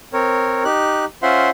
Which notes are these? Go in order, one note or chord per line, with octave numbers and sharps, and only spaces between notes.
C4 A#4 C#5
D#4 G4 F#6
C#4 F4 C5 E5 F#5 C6